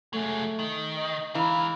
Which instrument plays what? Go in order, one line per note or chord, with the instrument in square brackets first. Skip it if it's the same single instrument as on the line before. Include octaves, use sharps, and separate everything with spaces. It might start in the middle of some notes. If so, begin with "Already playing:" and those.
[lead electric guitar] F#3 G#3 [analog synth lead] A3
[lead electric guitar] D#3
[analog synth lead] D#5
[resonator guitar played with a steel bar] E3 [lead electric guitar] G#3 A#4 [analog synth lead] F5